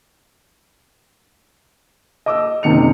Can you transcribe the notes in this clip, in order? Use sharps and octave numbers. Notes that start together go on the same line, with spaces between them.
D#5 D6 E6
F#1 C3 D#3 C#7 F7